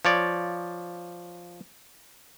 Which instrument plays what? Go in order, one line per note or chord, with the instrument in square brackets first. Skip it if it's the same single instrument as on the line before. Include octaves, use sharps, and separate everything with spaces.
[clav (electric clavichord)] F3 C#5 D5